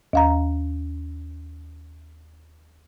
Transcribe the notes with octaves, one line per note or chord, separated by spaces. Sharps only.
D#2 F5 A#5